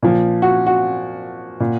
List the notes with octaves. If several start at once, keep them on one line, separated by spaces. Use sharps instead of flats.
A#2 F3
F#4
F#4
A#2